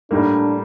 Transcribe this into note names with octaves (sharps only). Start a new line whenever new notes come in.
A2 G3 A#3 D4